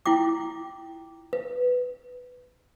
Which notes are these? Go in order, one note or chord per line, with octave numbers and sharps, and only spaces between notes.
E4 F4 G5 D6
B4